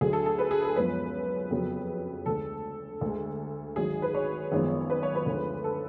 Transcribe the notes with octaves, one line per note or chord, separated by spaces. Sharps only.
D2 D3 F#3 G#4
A4
A4
B4
G#4
A4
F#2 F3 G#3 B3 B4
F2 C#3 F#3 B3
D2 D3 G#3 A4
D2 D3 G#3
G#1 G#2 F#3 G#4
B4
C#5
G#1 F#2 F3 G#3 B3
B4
C#5
B4
D2 D3 F3 G#3
A4